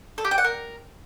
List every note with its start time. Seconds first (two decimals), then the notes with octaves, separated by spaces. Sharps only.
0.18 A4
0.25 G4
0.31 G5
0.38 F#5
0.44 A#4